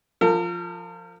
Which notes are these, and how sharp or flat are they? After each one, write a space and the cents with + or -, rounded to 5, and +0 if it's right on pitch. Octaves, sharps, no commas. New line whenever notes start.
F3 +0 A#4 -40